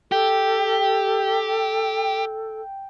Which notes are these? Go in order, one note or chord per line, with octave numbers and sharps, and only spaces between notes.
G4 A4 G5